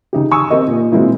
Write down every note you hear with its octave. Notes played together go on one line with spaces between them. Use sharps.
C#3 D#4 G4
G#5 C#6 D#6 E6
C4 G4 A#4 D#5
A#2
B2 G#3 A#3 C4 E4